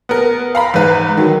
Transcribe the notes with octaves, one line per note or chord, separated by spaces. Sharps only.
B3 A#4
F5 A#5 B5
E2 G#2 B4
D#3 F#3